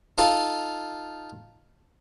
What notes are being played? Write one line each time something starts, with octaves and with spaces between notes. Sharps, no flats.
D#4 F4 A4 F5